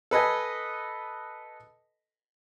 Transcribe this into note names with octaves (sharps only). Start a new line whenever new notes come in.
A4 B4 D#5 G#5